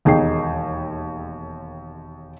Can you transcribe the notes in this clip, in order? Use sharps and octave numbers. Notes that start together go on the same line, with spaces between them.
E1 D#2 D#4 G#4 G5 C7